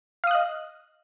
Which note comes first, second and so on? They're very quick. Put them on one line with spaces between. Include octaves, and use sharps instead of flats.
F5 D#6 F#6 D#5